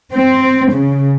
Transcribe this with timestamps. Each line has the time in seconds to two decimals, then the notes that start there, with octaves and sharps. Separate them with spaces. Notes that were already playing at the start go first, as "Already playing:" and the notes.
0.12 C4
0.71 C#3